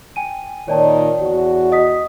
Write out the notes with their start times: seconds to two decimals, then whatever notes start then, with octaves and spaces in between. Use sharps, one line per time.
0.16 G5 G#5 D#7
0.68 A#2 D#3 C#5 D5 A5
1.22 E2 F#4
1.72 D#5 D#6 B6